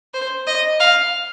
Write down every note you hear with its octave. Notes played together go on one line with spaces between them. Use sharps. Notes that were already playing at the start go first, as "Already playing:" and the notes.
C5
D#5
F5